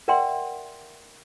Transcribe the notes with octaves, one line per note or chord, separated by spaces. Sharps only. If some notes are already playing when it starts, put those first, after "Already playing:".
A#4 D5 E5 F#5 G5 C6